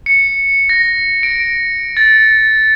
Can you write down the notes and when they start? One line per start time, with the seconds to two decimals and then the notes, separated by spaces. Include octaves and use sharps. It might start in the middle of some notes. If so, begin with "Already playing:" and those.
0.06 C#7
0.69 A#6
1.23 D7
1.97 A6